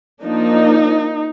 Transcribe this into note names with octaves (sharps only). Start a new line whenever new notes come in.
F3 A#3 D4 D#4